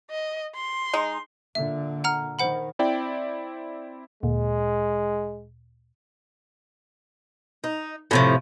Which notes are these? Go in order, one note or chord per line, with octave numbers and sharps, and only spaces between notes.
D#5
C6
G#3 D#4
A#2 D3 E5
F#5 A#5 F6
D#3 C5 F#5 B5
C4 E4 D5 G5
D2 A#2 G#3
D#4
A2 C3 F3